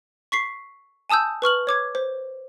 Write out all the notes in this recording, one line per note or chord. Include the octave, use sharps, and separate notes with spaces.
C#6 B6 C7
G#5 A5 D#6 E6 G6
B4 C#6 F6 F#7
C#5 D6 G#6
C5